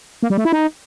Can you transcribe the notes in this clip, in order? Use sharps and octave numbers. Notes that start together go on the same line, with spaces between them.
A#3
G3
A3
E4
D#4